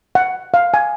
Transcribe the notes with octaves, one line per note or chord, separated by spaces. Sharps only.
F#5
F5
G#5